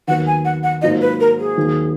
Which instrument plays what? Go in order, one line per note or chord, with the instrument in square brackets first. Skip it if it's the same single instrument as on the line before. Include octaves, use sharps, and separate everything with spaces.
[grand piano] D#2 D#3 F#3 B3 [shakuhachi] F#5
[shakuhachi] G#5
F#5
F#5
[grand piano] G#2 F#3 A#3 F4 [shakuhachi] D#5
[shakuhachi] B4
A#4
G#4
[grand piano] D#2 D#3 F#3 A#3